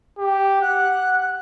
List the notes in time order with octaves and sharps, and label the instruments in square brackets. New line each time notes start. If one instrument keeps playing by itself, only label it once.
[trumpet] G4
[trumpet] F#5 [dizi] F#6